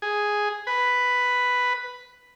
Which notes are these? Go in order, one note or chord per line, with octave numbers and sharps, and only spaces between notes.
G#4
B4